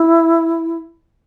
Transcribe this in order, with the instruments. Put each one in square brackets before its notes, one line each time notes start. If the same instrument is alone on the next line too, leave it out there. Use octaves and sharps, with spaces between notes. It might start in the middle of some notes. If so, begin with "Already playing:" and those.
Already playing: [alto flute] E4